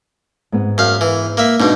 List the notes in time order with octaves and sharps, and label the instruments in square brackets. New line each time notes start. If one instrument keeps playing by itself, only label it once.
[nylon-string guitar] G#2 B3
[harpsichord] F#2 F5
E3
A#3 E5
[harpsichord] G#2 B2 [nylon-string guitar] D4 D#4